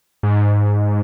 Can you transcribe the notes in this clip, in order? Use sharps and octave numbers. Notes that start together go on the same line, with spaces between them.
G#2